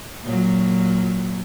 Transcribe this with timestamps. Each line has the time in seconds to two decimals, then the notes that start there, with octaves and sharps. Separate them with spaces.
0.22 A#2 F#3